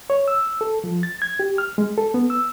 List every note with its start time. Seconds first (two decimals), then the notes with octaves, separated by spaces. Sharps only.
0.10 C#5
0.28 E6
0.61 A4
0.84 F3
1.03 A6
1.22 G#6
1.40 G4
1.58 F6
1.78 G#3
1.98 A4
2.14 B3
2.30 E6